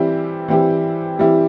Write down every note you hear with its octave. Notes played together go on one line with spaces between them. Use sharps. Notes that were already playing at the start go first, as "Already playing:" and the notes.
Already playing: E3 G3 C4 E4 G4
E3 G3 C4 E4 G4
E3 G3 C4 E4 G4